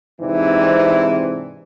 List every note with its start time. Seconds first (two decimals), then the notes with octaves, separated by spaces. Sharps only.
0.20 G#2 C3 E3 C4 D4 D#4